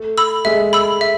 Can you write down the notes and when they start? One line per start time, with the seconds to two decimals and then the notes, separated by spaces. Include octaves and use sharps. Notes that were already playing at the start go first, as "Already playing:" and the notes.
Already playing: A3
0.18 B5 E6
0.45 G#3 E5
0.73 B5 E6
1.01 E5